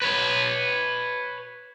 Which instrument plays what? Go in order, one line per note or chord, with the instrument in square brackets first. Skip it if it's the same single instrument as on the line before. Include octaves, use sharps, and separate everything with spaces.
[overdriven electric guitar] B4 C#5